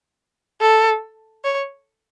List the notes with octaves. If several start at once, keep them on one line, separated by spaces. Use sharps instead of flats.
A4
C#5